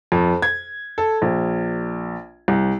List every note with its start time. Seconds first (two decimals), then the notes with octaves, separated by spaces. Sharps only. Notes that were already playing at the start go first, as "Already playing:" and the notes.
0.12 F2
0.42 G#6
0.98 A4
1.22 A#1
2.48 C2